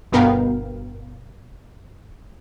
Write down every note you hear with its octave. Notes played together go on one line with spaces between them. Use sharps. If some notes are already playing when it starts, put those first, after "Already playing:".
G1 B2 B3 A#4 F5 G5